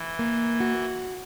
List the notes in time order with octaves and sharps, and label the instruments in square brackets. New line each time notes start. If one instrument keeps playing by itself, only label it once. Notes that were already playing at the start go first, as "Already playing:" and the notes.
Already playing: [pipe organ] E3
[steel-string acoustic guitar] A#3
F#4